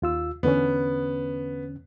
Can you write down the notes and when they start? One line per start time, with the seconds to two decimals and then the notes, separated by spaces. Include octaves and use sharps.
0.02 D#2 F4 E6
0.43 E2 D3 B3 C#4